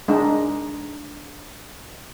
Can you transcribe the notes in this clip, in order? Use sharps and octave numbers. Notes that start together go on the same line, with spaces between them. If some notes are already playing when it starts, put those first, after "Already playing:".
G#3 D4 D#4